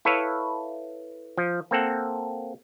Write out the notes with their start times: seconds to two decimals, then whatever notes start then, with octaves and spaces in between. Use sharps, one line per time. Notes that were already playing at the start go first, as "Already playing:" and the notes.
0.05 E4 A4 B4 C#5 E5 F5
1.37 F3
1.71 A#3 C4 A4 F#5